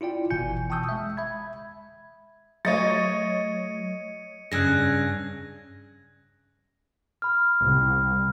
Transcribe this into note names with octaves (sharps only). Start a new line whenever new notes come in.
E4 F4 D5 G5
G1 B2 E3 G#5 G6 C#7
G5 A5 C#6 D#6 E6 G6
G#3 E5
E5 B5 G#6
F#3 A3 C#5 D#5 A6 C#7 D#7
G2 C#3 G#4 E6 F#6 G#6 A#6
B5 F6
C2